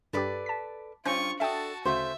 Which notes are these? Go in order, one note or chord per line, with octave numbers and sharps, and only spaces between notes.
G2 G4 A4 B4 D5
A5 B6
G2 C#4 F4 C5 C#6
D4 F#4 A4 E5 G5 A5 D#6
D2 C#3 A3 F#4 C5 E5